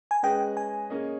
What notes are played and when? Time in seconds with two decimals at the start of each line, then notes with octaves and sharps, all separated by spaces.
0.11 G#5
0.23 G#3 C#4 G#4 B4 D#5 G5
0.57 G#5
0.90 A#3 C#4 G#4 D#5